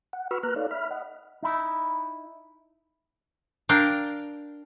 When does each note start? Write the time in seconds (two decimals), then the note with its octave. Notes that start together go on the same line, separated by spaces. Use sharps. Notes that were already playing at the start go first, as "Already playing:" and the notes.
0.13 F#5
0.31 F#4 B4 B5 C#6 E6 F6
0.43 A#3 B4 A#5 F6 F#6
0.56 D#4 A4 C#5 D5 F5
0.71 E5 B5 F6
0.91 D#5 F#5
1.43 D#4 E4
3.69 D4 A#4 F5 G5